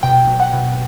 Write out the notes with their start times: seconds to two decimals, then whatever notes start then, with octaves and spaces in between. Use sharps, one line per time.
0.03 B2 G5
0.27 F#3
0.40 F#5
0.53 B2